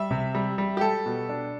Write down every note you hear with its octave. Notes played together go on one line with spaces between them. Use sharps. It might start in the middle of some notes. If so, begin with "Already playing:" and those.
Already playing: G3 E5
C3
G3
G3
G4
G3 A4
B2
D4